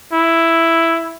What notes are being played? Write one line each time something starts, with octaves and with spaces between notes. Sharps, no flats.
E4